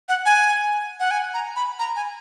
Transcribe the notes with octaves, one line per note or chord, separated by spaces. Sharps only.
F#5
G#5
F#5
G#5
A#5
B5
A#5
G#5